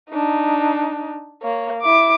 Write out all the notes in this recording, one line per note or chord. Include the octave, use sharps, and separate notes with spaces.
D4 D#4
A#3 C#5
E4 D6